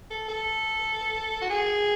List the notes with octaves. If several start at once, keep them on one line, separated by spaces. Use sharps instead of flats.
A4
A4
F#4
G#4